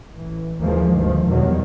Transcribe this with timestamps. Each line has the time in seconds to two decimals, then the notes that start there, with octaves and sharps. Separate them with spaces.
0.16 A1 E3
0.61 F#1 D#2 E3 F3 G#3 A#3
0.95 D2 G2 D#3 F3
1.28 E2 B2 D#3 F#3 G3